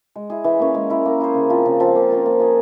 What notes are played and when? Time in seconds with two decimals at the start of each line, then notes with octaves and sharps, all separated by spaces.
0.16 G#3
0.30 E4 G#4
0.44 E3
0.59 A#3 C#4
0.74 G#3
0.90 E4 A#4
1.06 A#3
1.20 E4 G#4 C5
1.34 C#3
1.50 F3 C4 F4
1.66 C#3
1.80 F3 C4 F4
1.96 A#3
2.11 C#4 F4 A#4
2.26 A#3
2.39 F4 G#4